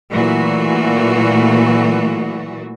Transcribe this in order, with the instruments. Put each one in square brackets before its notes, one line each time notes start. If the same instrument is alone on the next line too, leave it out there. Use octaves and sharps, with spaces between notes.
[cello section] A#2 E3 F#3 A3 F#4